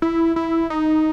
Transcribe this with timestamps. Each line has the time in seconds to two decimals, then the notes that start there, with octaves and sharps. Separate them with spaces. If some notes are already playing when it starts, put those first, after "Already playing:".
0.02 E4
0.36 E4
0.70 D#4